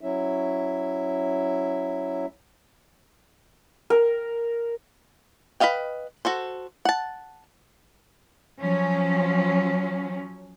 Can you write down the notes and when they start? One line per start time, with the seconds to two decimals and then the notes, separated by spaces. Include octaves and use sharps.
0.01 F#3 C#4 E4 E5
3.90 A#4
5.60 B4 C5 D#5 F5 G5
6.25 F#4 A4 C5
6.85 F#5 A5
8.60 F3 F#3 C#4